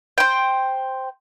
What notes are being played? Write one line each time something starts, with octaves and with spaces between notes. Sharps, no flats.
C5 G5